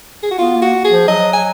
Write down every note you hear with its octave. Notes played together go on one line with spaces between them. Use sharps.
G#4
F#4
B3 F4
A#3
F#4
G#4
F3
F#3 D#5
G#5